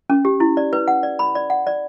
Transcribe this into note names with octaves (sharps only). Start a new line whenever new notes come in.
C#4
G4
E4
D5
B4
F#5
D5
B5
D5
F#5
D5